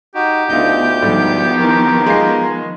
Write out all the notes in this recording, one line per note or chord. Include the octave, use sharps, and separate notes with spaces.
D#4 F#4 G4
D2 D3 B3 D#4 F4 G6
G#2 D#3 F3 G3 A3 B3
E3 C4 A#4
G#3 F4 C7